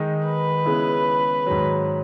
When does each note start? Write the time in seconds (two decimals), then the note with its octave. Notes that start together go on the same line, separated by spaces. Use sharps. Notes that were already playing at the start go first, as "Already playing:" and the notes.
Already playing: D#3 G#3 D#4
0.26 B4
0.65 C#3 G#3 B3 E4
1.46 G#2 D#3 F#3